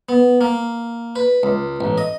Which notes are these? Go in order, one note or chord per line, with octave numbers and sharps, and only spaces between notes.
B3
A#3
B4
C#2
A1
D#5